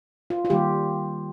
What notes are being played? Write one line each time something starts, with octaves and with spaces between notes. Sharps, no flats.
F4
F4
D#3 G3 A#3 G4